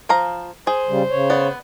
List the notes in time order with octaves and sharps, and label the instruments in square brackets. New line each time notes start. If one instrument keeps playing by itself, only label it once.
[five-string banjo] F3 F5 A#5
[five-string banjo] G#4 [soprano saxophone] C5
[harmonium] C#3 G3
C#3 C#5
[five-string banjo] B3 D5